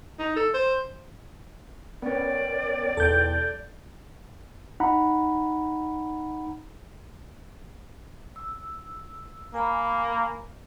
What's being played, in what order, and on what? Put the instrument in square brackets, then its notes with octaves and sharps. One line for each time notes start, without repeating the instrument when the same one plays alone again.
[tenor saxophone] D#4
A4
C5
[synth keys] B3 C#4 [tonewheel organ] A#4 C#5 G5 [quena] D5
[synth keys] B1 E2 [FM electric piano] A4 G6 [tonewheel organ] G5
[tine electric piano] D#4 F#5 A#5 B5
[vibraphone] E6
[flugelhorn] A#3 [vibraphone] G#5 A#5 B5